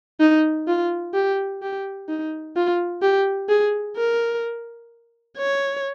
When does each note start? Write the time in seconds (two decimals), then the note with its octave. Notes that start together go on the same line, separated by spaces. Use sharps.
0.21 D#4
0.68 F4
1.14 G4
1.62 G4
2.09 D#4
2.56 F4
3.02 G4
3.49 G#4
3.97 A#4
5.38 C#5